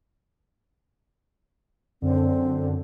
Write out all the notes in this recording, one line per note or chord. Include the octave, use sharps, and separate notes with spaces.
F#2 D3 C4